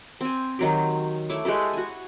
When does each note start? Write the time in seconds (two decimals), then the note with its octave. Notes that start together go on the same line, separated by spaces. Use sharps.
0.21 C4 G#5
0.59 D#3 F#3 G4
1.30 A3 E4 C#5 D6
1.45 G#3 G4 A4 B4
1.73 F#4 G#5